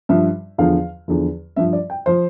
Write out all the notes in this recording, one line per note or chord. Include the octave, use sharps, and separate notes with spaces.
G2 F3 E5
E2 D3 F3 F5
E2 D3 F3
G2 F3 E5
D5
G5
F3 C5